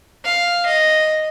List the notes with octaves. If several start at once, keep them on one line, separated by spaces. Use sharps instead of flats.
F5
D#5